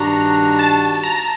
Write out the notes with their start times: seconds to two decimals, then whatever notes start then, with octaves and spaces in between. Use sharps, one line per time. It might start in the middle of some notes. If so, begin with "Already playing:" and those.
Already playing: G2 D#3 G3 D4 F#4 A#5
0.59 A5
1.04 A#5